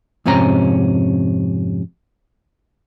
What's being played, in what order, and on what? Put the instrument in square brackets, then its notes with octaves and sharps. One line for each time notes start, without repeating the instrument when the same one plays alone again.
[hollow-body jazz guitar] F2 G#2 C3 C4 C#4 A#5